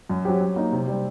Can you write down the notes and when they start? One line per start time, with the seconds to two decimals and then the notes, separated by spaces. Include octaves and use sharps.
0.10 F#2
0.25 F#3 C4 G4
0.41 F#3
0.56 A#3 D#4
0.72 C3
0.88 G3 C4